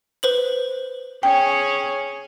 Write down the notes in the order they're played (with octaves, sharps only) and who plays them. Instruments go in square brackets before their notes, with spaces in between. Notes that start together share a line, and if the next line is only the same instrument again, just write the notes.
[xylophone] B4 C5 F#7
[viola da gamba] C#4 G#4 C#5 [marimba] G5